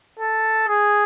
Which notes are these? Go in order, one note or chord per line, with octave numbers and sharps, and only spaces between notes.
A4
G#4